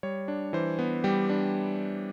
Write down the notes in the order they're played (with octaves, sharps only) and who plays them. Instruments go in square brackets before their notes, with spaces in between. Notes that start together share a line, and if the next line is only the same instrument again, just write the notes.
[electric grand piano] G3 C#5
D4
E3 C5
B3
G3 G4
D4